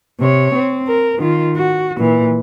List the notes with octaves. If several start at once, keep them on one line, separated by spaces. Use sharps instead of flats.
C3 C#5
C4
A#4
D#3 F4
F#4
A#2 E3